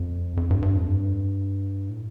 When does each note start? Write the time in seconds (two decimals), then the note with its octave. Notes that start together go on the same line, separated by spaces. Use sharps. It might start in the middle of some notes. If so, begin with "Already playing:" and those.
Already playing: F2
0.37 F2
0.50 G2
0.62 G2
0.76 F2
0.88 G2
1.89 A2